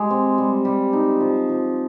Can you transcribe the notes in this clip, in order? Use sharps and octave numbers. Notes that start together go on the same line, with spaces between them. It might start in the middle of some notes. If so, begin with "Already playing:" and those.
Already playing: G#3 G4
C4
G3
G3
D#4
F3
F3